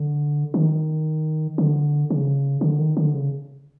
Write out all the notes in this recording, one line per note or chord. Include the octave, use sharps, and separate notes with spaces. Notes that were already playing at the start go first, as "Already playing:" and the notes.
Already playing: D3
D#3
D3
C#3
D3
D#3
D3
C#3